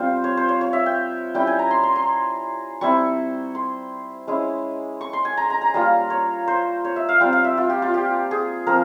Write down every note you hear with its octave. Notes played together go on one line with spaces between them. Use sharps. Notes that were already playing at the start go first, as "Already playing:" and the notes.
Already playing: G3 C4 F4 C5
C#5
C5
C#5
C#5
E5
G5
G3 C#4 E4 G5
G#5
A#5
C6
C6
C6
G3 C4 E4 C#6
C6
G#3 C#4 E4
C#6
C6
G#5
A#5
A#5
A#5
G3 A#3 F4
C#5
C5
C#5
E5
F5
G3 C4 F4 G5
F5
E5
F4
G4
F4
G4
G#4
F3 C4 A#4